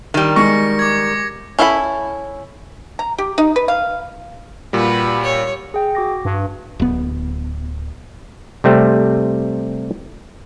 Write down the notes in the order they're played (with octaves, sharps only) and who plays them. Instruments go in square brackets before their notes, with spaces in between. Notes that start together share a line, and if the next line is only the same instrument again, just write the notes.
[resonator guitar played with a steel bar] D#3 G3
[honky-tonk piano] G#3 C#6 [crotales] A#6 C#7
[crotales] D6 G#6
[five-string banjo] C#4 E4 A4 F5 B5
[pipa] A#5
G4
D#4
B4
F5
[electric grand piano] A#2 G3 [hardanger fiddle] F#4 B4
[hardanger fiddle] C#5
[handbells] G#4 G5
F#4 D6 A#6
[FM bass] G2
[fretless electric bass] D1 B3
[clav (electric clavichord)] C3 G3 A3 C4